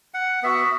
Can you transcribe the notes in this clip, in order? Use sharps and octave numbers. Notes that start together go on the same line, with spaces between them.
F#5
B3 F#4 E5